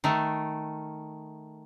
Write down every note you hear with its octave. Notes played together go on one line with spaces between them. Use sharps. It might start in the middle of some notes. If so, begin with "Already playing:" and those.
D#3 A3